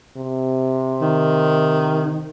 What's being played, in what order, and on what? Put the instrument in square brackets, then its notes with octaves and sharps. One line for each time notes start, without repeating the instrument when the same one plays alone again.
[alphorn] C3
[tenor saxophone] D#3